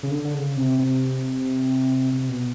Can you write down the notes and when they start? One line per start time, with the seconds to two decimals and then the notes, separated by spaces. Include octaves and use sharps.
0.03 C#3
0.11 D3
0.24 D3
0.34 C#3
0.57 C3
0.79 C3
2.13 C3
2.28 B2